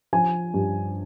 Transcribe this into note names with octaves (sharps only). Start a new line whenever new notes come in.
F3 G#5
G2